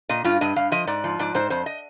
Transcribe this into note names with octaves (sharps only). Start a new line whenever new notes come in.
A#2 D#5
G2 F4
G2 D#5
G2 F5
F3 D#5
G#2 D5
F3
G#2 D5
G#2 C5
F2 C5
D#5